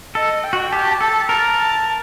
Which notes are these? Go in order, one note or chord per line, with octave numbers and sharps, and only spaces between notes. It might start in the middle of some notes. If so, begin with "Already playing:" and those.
A4 D#5
G5
F#4
G4 A5
A4 A5
A#4 A5
A5